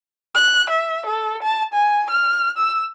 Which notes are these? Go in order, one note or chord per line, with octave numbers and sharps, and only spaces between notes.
F#6
E5
A4
A5
G#5
F6
E6